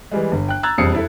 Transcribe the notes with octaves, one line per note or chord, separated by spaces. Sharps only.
E3 G3 G#3
G1
G5 F#6
A#5 E6 F#6 G#6 A6
E1 F2 G3 D#6 C7 C#7
E4 A4